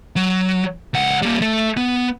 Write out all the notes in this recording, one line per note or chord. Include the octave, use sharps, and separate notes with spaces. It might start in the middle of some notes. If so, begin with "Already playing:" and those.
F#3
C#2 F#5
G3 A#3
A3 A4
B3